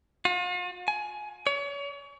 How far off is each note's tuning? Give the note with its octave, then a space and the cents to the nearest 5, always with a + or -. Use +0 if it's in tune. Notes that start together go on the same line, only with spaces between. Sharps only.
F4 +45
G#5 +20
C#5 +35